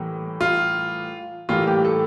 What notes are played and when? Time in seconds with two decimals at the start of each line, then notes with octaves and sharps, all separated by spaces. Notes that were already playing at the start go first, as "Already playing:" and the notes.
Already playing: A2 E3 G3 A#3
0.41 F4
1.49 A2 E3 G3 A#3 F4
1.67 G4
1.85 A4